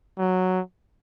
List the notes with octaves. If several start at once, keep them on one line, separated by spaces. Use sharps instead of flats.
F#3